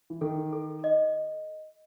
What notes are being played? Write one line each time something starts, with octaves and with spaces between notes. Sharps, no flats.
E3
D#3 A4
A4
D#5